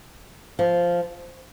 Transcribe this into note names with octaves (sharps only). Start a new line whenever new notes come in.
F3